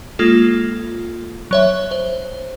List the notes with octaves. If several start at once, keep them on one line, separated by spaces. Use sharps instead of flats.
G#3 A#3 F4 A4
F#3 C#5 E5
C5